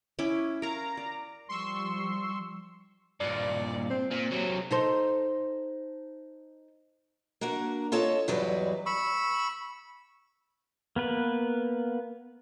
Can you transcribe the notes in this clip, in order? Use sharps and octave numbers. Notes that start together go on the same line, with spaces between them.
C#4 E4 D6
A#4 F5 A#5
D5
F3 G3 C6 C#6 E6
G2 A#2 D5
C4
A#2 C4
C3 F#3
D#4 A4 C5
A#3 D4 F#4 A#4
F4 A4 C#5 D#5 A5
E2 G#2 F#3 G3 B4 D5
B5 C#6 E6
A#3 B3 B4